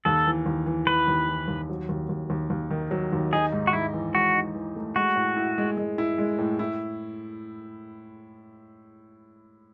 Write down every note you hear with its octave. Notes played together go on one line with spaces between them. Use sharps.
D#2 A4
E3
D#2
E3
E3 B4
D#2
E3
D#2
F#3
D#2
D#2
D#2
D#2
D#3
F#3
D#2
D#4 G#4
G#2
F#4
G#2 E4
E3
G#2 F#4
D#4
E3
A3
G#3 F#4
A2
E4
G#3
G#3
E4
G#3
A2
E4